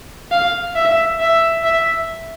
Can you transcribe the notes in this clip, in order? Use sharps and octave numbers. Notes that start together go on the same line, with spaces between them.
F5
E5
E5
E5